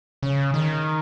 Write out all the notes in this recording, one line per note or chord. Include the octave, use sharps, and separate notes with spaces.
C#3
D#3